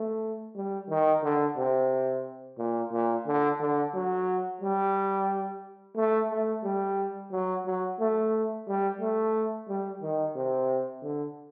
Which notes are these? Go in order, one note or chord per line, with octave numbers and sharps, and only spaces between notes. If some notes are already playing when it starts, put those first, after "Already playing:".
Already playing: A3
G3
D#3
D3
C3
A#2
A#2
D3
D3
F#3
G3
A3
A3
G3
F#3
F#3
A3
G3
A3
G3
D#3
C3
D3